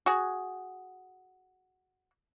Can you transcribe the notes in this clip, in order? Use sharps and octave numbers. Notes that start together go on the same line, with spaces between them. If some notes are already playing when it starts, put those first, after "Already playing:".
F#4 G#4